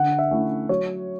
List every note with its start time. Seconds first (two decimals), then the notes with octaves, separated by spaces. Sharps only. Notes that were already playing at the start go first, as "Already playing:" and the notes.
Already playing: D3 F#5
0.19 E5
0.31 A3 C#4 E4
0.69 F#3 C#5